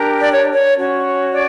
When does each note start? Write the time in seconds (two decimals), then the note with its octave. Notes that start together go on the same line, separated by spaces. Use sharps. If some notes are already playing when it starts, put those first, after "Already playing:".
Already playing: D4 G4 A#4
0.21 D5
0.31 C#5
0.53 C#5
0.76 C#4 F#4 C#5
1.32 D5